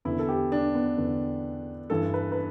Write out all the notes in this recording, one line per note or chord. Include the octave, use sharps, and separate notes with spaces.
E2 D3 E4
A4
G4
D4
B3
E2 D3
G2 E3 A4
B4
B4